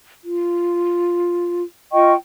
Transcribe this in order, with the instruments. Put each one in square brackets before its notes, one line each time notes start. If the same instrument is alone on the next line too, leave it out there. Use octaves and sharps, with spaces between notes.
[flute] F4
[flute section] F4 G5 C#6 [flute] D#5